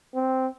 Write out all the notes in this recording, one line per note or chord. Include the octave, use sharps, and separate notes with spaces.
C4